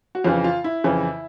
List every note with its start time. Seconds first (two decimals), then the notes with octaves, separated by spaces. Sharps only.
0.15 F#4
0.24 F2 C#3 E3 F4
0.44 F4
0.64 E4
0.84 F2 C#3 E3